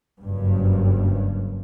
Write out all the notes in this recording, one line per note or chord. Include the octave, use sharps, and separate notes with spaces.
F#1 G2